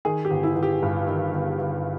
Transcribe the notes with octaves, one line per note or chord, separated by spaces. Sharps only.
D#3 G#4
G4
G1
E4
G1
G4
G2
D#3
G1
G1